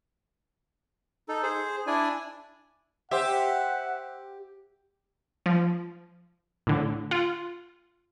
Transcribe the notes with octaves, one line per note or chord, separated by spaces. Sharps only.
D#4 A4
G#4 C5
D4 E4 D5 G#5
G4 C5 E5 F#5
F3
A2 D3
F4